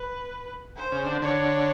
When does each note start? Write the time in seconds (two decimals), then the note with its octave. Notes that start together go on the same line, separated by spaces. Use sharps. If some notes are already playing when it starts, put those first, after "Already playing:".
Already playing: B4
0.76 C5
0.92 C#3
1.06 D3
1.22 D3 C#5